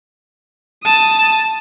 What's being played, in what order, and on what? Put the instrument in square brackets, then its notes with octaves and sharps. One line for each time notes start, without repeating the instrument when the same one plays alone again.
[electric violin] A5 D#6